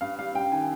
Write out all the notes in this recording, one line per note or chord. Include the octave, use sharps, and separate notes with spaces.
G2 F5
G3 F5
G3 G5
D#3 G#5